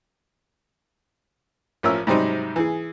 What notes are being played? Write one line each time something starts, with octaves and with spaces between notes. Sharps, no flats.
A1 F3 C#4 A#4 E5 E6
G#2 C3 F#3 G3 C4 D#4
E3 G#4